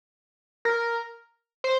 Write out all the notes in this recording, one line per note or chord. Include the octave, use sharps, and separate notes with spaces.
A#4
C5